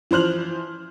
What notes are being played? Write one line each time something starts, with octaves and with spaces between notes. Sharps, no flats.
E3 F3 C5 F6 F#7